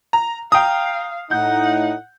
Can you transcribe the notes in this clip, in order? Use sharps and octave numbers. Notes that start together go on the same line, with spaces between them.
A#5
F5 G5 A#5 D#6
A2 D#4 F#5 G6